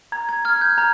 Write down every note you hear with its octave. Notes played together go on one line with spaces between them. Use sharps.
A#5 G#6
G#6
F6 G#6
G6
A#5 G#6